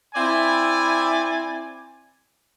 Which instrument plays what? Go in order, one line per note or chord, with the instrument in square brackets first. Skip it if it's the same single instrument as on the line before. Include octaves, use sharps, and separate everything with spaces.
[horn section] C4 E4 D5 G#5